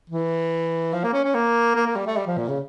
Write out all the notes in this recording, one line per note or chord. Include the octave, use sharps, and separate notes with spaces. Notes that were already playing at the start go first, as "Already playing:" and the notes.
E3
F3
A#3
C#4
C#4
A#3
A#3
A#3
G3
A3
G3
F3
A#2
C#3